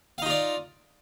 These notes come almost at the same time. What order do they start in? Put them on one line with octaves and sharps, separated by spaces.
F5 D#4 F4 D5